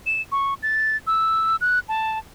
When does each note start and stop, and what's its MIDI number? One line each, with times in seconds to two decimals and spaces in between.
0.06 0.22 100
0.32 0.54 85
0.63 0.97 93
1.07 1.56 88
1.61 1.79 90
1.89 2.19 81